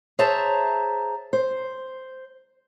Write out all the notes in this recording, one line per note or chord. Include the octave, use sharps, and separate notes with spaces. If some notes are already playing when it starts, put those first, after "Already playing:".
G#4 C5 C#5 E5 A5 A#5
C5